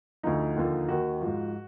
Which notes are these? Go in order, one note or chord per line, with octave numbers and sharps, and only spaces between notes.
D2 D3 F3 D#4
D#2 D3 F3
D#2 D#3 F#4
G#2 F3